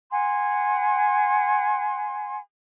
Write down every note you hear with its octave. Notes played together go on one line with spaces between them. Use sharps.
F#5 G#5 C6